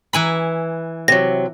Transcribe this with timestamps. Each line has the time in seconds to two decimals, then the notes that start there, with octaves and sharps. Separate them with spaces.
0.13 E3 G#5 B5
1.08 C3 F#3 A#6